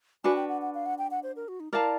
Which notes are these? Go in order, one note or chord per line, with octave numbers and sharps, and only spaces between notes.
D4 F#4 B4 G#5
G5
F#5
F#5
F5
F#5
G5
F#5
C5
A#4
F#4
D#4
E4 A#4 D5 F5 A5